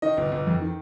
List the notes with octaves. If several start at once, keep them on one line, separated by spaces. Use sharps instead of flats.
D#3 D#5
G1
G1
F2
D#3